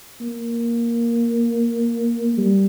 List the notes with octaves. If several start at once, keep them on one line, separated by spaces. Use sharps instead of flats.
A#3
G3